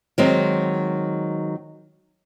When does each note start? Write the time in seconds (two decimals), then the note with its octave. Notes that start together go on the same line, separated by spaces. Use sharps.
0.18 D#3 F#3 G#3 C4